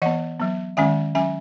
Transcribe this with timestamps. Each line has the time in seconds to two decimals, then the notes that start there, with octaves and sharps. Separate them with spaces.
0.02 E3 B3 D#5 F#5
0.40 F#3 B3
0.77 D#3 G#3 C#4 E5 G#5
1.15 F#3 C#4 E5 G#5